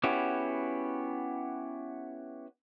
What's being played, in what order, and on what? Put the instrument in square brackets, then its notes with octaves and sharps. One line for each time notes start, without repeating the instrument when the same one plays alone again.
[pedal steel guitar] B3 C#4 E4 F#4 G4